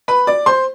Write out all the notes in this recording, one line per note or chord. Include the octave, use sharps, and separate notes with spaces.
B4 B5
D5 D6
C5 C6